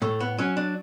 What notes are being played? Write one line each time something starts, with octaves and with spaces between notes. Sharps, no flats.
A2 A3
B3
F#3 C#4
D4